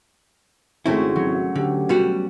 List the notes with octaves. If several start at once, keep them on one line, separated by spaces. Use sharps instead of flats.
G#1 G#3 A3 C4 C#4 E4 F#4
F#3
D2 D3 G4
B2 G3 F#4